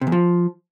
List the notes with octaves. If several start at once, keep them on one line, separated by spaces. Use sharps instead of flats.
C3
E2
F3